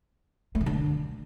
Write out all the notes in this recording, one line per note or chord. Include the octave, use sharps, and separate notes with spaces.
A3
C#3
D3